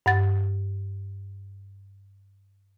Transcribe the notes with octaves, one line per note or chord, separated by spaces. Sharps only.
G2 F#5 A6